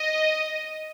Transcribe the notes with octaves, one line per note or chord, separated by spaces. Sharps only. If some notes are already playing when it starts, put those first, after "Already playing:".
Already playing: D#5